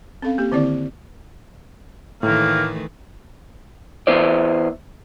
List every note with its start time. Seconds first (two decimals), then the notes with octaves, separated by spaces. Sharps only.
0.22 C4 C#4 A4 F5
0.38 A#3 G4
0.52 D3 D#3 C4 E4 D5
2.23 A2 D#3 E3 A3 A#3
4.07 E3 B3 E4 C5 D5